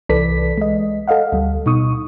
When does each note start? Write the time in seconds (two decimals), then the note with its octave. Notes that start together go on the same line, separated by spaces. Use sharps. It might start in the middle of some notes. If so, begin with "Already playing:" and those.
0.09 C2 E3 A4 B4 D5 B6
0.58 G#3 D#5
1.08 A4 D#5 F5 F#5
1.32 D2 G3
1.66 B2 D#4 C#6 D#6